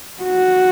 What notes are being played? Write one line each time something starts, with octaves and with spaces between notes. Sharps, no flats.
F#4